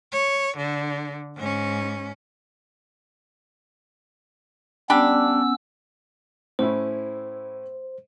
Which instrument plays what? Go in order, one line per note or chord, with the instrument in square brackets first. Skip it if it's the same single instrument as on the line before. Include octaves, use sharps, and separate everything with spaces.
[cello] C#5
D3
G#2 C#4
[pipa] G3 D4 [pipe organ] B3 C#4 E6
[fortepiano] A2 C#4 E4 [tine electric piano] C5